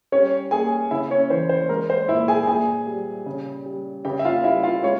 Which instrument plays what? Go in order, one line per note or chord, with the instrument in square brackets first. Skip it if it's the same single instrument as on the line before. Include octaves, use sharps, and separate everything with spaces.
[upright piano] G3 C#4 C#5
A#3 G#4 G#5
C#3 E4 E5
C#4 C#5
E3 C5
C5
G#3 A#4
C5
A#2 E4 E5
G#4 G#5
A#2 G#4 G#5
G3
C#3
G3
C#3 G4 G5
E5
F4 F5
G3 E4 E5
F4 F5
G#3 C#4 C#5